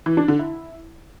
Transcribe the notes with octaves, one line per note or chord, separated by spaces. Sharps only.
E3
D4
D3
E4